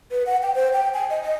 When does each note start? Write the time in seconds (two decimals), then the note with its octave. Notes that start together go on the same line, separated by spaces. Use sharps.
0.11 B4
0.26 F#5
0.43 G5
0.55 C5
0.73 G5
0.94 G#5
1.10 D#5
1.23 D#5